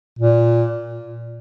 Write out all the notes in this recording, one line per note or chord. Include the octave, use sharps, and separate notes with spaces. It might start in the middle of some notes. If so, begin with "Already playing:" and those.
A#2